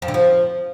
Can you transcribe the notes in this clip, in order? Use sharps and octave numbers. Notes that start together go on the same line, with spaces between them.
F2
D3
F3